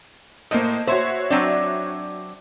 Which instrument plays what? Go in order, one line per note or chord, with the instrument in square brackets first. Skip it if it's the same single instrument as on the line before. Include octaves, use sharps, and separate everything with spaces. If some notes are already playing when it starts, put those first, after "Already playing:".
[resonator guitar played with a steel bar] A2 [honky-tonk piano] A#3 C5 D#5
[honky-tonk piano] F#4 C#5 E5 [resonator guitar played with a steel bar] C5
[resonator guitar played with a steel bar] F#3 C4 D4